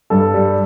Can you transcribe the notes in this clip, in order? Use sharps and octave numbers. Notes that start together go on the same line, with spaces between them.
G2 A4
G3